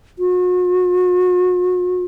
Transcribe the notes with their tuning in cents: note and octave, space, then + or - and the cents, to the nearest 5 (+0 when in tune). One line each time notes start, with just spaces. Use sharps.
F#4 -40